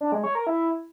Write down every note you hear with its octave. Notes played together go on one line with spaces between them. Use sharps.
D4
G#3
C#5
A#4
E4